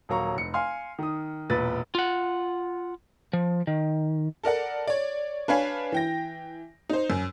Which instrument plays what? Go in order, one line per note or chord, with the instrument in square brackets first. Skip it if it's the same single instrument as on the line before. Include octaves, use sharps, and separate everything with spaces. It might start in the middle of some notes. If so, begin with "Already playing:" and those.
[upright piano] D#1 F#3 A#3 A#5 C#6
F1 C#7
F5 G#5 C6 F6
D#3 D#6
E1 A#2 B4 A6
[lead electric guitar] F4 F#5
F3
D#3
[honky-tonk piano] A4 A#4 D5 F#5
C#5 D5
D4 B4 C#5 F5 G#5 B5
E3 G5 A#6
D#4 C5
F#2